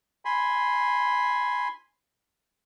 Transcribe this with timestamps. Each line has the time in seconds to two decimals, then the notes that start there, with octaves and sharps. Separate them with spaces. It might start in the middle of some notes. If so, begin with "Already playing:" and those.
0.25 G#5 B5 C6